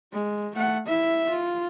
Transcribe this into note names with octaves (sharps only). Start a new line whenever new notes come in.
G#3
A3 F#5
E4 E5
F4